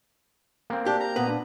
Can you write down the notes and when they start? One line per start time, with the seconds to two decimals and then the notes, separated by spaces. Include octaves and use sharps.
0.70 A#3 C4
0.86 D4 G4
1.00 A#5
1.16 A#2 B3 B4
1.28 D4